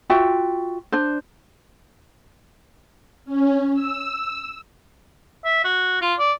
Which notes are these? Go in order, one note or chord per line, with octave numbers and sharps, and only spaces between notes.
F4 F#4 E5 G5
D4 C5
C#4
E6
E5
F#4
F4
D5